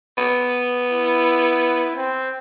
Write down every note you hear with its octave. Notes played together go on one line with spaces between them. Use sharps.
B3
E4
C4